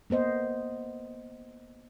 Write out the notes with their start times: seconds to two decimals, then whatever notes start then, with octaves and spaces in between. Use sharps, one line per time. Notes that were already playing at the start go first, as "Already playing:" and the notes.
0.10 A#3 B3 C5 D#5